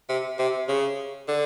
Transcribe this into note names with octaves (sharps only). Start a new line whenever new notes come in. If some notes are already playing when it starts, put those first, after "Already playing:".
C3
C3
C#3
D3